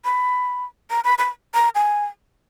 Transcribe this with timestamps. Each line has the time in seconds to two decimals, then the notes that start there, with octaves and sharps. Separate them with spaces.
0.05 B5
0.90 A#5
1.04 B5
1.18 B5
1.54 A#5
1.75 G#5